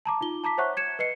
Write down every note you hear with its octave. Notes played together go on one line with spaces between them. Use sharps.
A5 A#5 D6
D#4 F4 G7
A5 A#5 D6 B6
C5 C#5 E5 F#5 C#6 F#6
G#6 C#7 E7
B4 D#5 C7 C#7